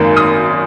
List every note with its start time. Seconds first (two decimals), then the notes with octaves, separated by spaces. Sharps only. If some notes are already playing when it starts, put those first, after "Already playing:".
Already playing: G#1 F#2 D#3 A#3
0.16 D#6